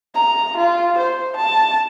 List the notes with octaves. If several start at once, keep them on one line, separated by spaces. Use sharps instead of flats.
A#5
F4
C5
A5